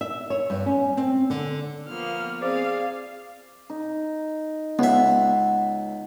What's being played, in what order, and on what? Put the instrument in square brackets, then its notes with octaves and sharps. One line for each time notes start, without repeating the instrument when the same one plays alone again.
[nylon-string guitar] E5
C#5
G2
C#4
C4
D3
[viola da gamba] F3 B3 [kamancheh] A#3 F6
[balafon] C4 C5 [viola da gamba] G#4 [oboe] D5 [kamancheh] F5
[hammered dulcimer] D#4
[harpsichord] C#2 E5 [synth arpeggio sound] B3 [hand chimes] F#5